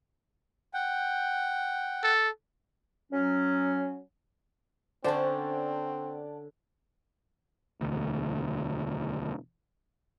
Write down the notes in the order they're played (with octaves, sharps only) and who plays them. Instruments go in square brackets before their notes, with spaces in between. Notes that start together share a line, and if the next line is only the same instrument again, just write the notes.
[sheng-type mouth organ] F#5 G5
[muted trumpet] A4
[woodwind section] F#3 C#4
[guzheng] D3 C#4 [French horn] C4 [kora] C5 [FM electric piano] D5 F#5 A5
[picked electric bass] E1 D2